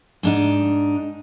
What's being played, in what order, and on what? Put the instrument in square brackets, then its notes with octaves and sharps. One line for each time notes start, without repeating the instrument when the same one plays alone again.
[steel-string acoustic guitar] G#2 D4 D#4